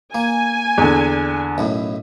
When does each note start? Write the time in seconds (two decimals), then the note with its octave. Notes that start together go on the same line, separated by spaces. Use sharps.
0.15 A#3 G#5
0.78 E2 D3
1.58 B1 F#2 A2